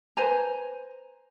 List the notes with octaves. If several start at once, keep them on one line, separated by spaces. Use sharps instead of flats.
B4 C5 G#5 A#5